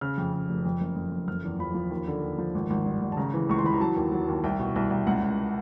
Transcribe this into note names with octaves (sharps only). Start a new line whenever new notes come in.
C#3 F6
F2
C#3
F1
F2
F#1
F2
F2
F#1 F6
E2
F3 B5
F3
D#2
D3
D#2
F3
G#1
G#1
G2
G#1
A5
C#3 A#5
E3
C#2 C#6
C6
E3 B5
A#5
F#3 A5
D#2
F#3
D#2
C2 G5
B2
C2
C2
C#2 F#5
C#2